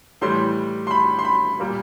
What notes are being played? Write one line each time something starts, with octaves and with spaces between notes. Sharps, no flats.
A2 E3 G3 C6
C6
B5
C6
B5
A#2 G3 A#3